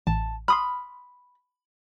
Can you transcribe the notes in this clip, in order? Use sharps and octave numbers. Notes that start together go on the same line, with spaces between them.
A1 A5
B5 C6 D#6 F6